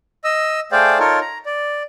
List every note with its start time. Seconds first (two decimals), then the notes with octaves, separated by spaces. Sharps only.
0.24 D#5 E6
0.72 A3 G#4 C5 D5 F5 G5
0.99 D#4 F4 A4 A#4 C#5
1.21 A#5
1.46 D5